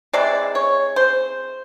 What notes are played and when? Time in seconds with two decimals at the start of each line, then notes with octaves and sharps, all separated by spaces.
0.13 C3 E3 G#3 D5
0.55 C#5
0.96 C5